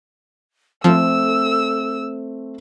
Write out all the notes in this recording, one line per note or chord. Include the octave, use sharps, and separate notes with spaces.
F3 A3 C4 A4 E6